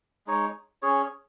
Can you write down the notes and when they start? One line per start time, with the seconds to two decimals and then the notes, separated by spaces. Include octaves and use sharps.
0.27 G#3 D#4 C#5
0.82 C#4 G#4 C#5